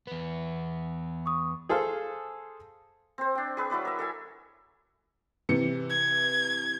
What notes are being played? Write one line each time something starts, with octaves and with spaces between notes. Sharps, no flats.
E2 B3
C#6 D#6
G#4 A4 C5 F5
C4 C5
D4 G5
G#4 B4 E6
F#3 E4 B4 D5
A#4 E5
A4 E5 G#5
C3 E3 C#7
G#6